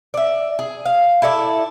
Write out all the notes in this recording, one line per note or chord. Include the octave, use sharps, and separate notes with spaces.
D5 E5
G#4
F5
E4 A4 D5 E5